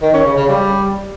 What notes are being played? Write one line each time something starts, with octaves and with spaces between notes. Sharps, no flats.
D#3
C#4
C#3
C#3
G3